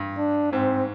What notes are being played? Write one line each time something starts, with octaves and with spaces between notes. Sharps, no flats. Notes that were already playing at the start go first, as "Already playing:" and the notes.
Already playing: G2
D4
G#2 C4